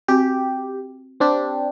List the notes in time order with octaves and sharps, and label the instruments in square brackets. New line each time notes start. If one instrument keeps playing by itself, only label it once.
[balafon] C4 F#4 [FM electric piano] G4
[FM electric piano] C4 D4 G4